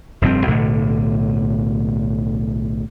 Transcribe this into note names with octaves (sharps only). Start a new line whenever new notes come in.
F1 G2 F3 C4
B1 A2 D3